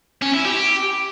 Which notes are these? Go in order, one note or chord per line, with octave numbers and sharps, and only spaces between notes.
C#4
E4
G4